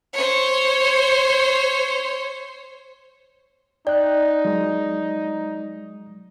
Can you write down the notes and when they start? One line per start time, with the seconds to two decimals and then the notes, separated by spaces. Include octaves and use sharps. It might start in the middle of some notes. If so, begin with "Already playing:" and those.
0.13 C5 C#5
3.87 D#4 D5 G5 F#6
4.45 F#3 G#3